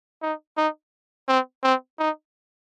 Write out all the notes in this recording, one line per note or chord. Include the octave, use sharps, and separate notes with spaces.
D#4
D#4
C4
C4
D#4